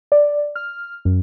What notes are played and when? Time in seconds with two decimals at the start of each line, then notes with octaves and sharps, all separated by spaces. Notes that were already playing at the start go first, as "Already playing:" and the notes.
0.12 D5
0.56 F6
1.05 F#2